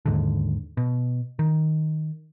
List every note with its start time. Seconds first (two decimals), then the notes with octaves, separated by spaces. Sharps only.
0.05 D#2 G#2 D3
0.77 B2
1.39 D#3